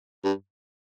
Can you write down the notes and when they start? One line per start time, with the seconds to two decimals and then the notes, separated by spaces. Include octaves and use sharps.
0.24 G2